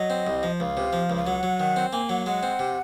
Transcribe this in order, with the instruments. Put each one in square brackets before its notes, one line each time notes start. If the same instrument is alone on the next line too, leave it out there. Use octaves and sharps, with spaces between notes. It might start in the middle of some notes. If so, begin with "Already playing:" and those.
Already playing: [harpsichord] F#3 [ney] D#5
[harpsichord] C4
C2
F3
[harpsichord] C#2 [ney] F5
[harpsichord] C3
F3
C#2
[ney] F5
[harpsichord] F#3 [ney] F#5
[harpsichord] F#3
D#3
C4
[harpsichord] A#3 [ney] G#5
[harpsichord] F#3 [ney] F#5
[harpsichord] G#3 [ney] F#5
[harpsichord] C4
C3